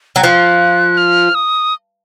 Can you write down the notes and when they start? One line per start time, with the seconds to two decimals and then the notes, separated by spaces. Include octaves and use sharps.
0.16 F#3
0.22 F3 F#6
0.97 F6
1.35 D#6